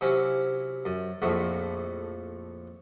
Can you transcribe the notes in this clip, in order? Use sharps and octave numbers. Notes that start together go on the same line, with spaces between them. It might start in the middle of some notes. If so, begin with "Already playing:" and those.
C3 F#3 C#4 E4
F#2
A#1 F2 A2 F#4 E5